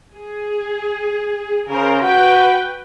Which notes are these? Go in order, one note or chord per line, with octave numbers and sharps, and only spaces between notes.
G#4
C#3 A#4 C5
F#4 B4 G5